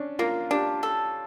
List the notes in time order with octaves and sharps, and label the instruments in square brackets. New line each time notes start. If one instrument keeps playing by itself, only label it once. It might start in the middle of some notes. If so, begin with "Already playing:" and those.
Already playing: [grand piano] C#4 D4
[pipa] A#3 [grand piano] F4
[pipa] D4 [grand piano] G4
[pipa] A4